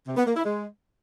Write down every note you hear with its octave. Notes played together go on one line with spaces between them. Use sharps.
C3
B3
A#3
E4
G#3